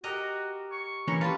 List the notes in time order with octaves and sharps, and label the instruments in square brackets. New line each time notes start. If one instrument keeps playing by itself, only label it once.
[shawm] F#4 [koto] G4 A#4 D#5
[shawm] C#6
[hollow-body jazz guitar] E3 A#3 C#4 [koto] A#4 [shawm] C#6
[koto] G3 F4 [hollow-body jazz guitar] B4 [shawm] A5